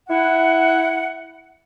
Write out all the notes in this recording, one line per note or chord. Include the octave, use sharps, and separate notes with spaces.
E4 F#5